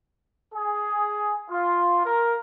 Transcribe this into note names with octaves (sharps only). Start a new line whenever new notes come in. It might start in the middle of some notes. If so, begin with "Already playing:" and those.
G#4
F4
A#4